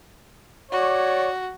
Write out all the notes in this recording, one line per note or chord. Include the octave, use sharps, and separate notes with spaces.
F#4 C#5 D5